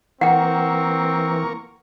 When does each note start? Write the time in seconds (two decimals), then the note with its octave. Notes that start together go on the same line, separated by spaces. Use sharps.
0.21 E3 A#3 C4 A#4 F#5 G5 C#6